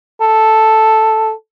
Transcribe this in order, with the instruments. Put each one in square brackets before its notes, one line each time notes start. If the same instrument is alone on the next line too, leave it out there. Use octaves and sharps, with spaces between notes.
[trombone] A4